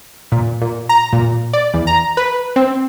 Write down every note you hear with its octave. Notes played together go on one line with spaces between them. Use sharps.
A#2
A#2
A#5
A#2
D5
E2
A#5
B4
C4